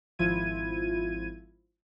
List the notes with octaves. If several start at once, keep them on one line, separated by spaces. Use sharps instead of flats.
G#1 F3 E4 F4 G#6 D#7